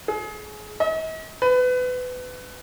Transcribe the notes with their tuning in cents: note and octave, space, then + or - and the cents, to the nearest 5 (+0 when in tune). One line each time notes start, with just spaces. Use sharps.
G#4 +30
D#5 +45
B4 +25